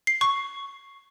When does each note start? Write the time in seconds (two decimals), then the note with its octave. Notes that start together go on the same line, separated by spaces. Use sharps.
0.07 C7
0.21 C#6